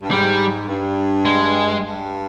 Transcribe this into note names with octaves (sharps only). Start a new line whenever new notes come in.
G2
G#2 G3
G2
G#3
G2